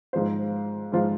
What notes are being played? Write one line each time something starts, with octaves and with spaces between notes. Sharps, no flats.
G#2 F3 G#3 F4 C5
G#2 F3 G#3 F4 C5